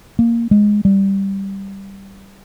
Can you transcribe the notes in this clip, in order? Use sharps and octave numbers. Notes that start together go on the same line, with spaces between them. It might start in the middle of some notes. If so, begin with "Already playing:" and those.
A#3
G#3
G3